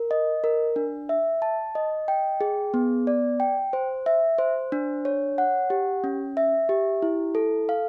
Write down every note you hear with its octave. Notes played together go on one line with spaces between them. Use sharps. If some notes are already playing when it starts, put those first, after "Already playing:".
Already playing: A#4
D#5
A#4
D4
E5
A5
D#5
G5
G#4
B3
D5
G5
C5
E5
C5
D4
C#5
F#5
G4
C#4
E5
G4
E4
A4
F5